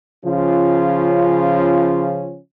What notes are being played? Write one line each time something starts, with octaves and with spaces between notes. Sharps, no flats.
C#3 F3 C#4 F4